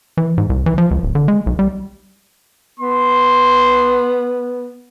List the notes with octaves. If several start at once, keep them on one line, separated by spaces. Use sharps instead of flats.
E3
G#2
C2
E3
F3
C#2
D1
D3
G#3
B1
G3
B3 C6